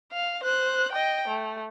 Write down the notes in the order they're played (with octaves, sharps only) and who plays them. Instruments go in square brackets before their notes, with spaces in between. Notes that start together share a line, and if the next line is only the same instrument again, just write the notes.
[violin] F5
C5 F#6
D#5 G5
A3